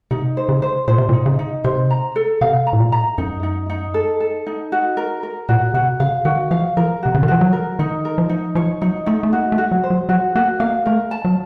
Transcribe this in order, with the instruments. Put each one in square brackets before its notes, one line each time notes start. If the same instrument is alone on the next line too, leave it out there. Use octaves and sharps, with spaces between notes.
[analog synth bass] C3 [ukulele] D#4
[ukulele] C5
[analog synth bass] C#3
[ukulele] C5
[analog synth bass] A#2 [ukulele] C5
[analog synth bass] C3
A#2
[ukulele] D#4
[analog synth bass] C#3
[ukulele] D#4
[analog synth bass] C3 [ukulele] C5
[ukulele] A#5
A4
[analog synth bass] C3 [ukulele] F5
[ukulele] A#5
[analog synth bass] A2
A#2
[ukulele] A#5
[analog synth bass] F#2 [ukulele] D#4
[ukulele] D#4
D#4
A4
A4
D#4
F#4
A#4
A#4
[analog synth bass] A#2 [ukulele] F#4
[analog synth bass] C3 [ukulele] F#4
[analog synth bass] C#3 [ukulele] F5
[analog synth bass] D#3 [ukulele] F#4
[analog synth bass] F3 [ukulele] F5
[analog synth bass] F3 [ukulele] A#4
[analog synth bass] C3 [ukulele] F#4
[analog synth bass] C#3
D#3
[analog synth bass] F3 [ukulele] F#4
[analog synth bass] F#3
[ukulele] A#4
[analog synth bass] D#3 [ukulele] D#4
[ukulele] A#4
[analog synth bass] F3
[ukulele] D#4
[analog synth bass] F3 [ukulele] C#5
[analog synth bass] F#3 [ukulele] D#4
[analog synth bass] A3 [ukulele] D#4
[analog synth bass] A3
[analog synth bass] A#3 [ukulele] F#4
[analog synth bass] A3
[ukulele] F#4
[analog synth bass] F#3
[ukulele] C5
[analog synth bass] F#3
[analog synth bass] F#3 [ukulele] F#4
[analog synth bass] A#3 [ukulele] F#4
[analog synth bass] A#3 [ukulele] F5
[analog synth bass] A3 [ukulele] A#4
[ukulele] A5
[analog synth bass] F#3